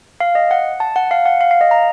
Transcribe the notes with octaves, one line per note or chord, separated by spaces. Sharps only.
F5
D#5
F#5
A5
F#5
F5
F#5
F5
F5
D#5
A#5